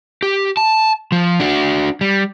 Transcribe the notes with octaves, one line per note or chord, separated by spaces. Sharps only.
G4
A5
F3
D4 F#4
G3